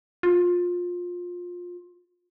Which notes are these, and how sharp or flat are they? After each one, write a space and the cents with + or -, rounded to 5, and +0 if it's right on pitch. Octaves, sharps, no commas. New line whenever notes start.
F4 +20